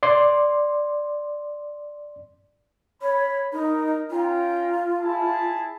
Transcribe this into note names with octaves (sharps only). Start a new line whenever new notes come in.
D5 C6
C#5 B5
D#4 A#4 A#5
C#4 F4 G5 A#5
E4 G#4 A5